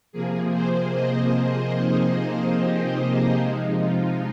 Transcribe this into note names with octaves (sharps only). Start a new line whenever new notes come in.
C3 F3 A#3 G#4
C5
D#5
D#4
G4
D#4
C3 F3 G#3 D#4
F4